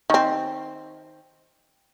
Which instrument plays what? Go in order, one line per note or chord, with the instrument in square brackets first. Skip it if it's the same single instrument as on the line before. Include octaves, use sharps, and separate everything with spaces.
[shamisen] D#3 C4